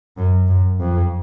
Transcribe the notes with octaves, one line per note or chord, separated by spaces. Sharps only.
F#2
F#2
F2